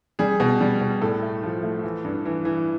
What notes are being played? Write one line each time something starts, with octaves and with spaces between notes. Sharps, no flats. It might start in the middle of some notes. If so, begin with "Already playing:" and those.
G3 G#4
B2
G3
B2
A2 A4
A3
F3
A3
E3
G2
E3
E3